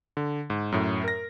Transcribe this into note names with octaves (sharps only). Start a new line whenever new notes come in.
D3
G#2
F#2 A2
A#4 A#6